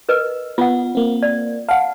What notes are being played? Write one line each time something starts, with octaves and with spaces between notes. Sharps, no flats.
A#4 B4 D#5
B3 F4 F#5
A#3 C4
D5
F5 F#5 A5